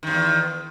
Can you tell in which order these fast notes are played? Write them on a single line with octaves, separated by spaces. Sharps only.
D#3 G2 E2